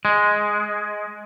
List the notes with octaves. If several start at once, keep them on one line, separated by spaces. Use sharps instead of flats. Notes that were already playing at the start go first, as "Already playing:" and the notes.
G#3